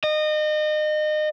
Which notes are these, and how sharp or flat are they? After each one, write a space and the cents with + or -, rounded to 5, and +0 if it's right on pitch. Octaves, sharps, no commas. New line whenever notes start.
D#5 -30